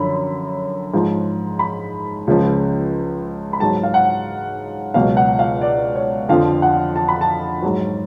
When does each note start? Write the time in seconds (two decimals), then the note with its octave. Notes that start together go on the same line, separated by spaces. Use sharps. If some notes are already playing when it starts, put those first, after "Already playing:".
Already playing: F#2 D3 F3 B5
0.94 G#2 F3
1.59 B5
2.27 C#2 C#3 F3
3.53 B5
3.60 G#2 F#3 A5
3.83 F5
3.94 F#5
4.94 C#2 B2 F#3 F5
5.17 F#5
5.39 F5
5.61 D5
5.96 C#5
6.29 F2 D3 F3 F5
6.62 F#5
6.96 A5
7.08 B5
7.21 A5
7.62 G#2 F#3